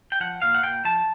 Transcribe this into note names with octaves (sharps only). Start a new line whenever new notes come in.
G5
F3 F#5
A#2 F5
F#5
A#2 G5
F3 A5